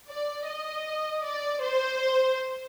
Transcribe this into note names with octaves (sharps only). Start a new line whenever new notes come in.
D5
D#5
D5
C5